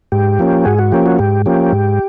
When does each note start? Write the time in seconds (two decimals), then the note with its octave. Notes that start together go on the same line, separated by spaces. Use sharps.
0.12 G#2 G4
0.39 F3 A#3 C#4
0.65 G#2 F#4 G#4
0.79 F#4
0.92 F3 A#3 C#4 G4
1.06 F#4
1.19 G#2 G4
1.46 F3 A#3 C#4 G4
1.72 G#2